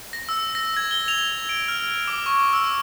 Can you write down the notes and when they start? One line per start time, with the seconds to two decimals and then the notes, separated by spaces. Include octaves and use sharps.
0.13 A#6
0.29 E6
0.55 A#6
0.77 G#6
0.91 G7
1.08 F7
1.49 D7
1.68 F6
2.08 D6
2.26 C#6
2.53 E6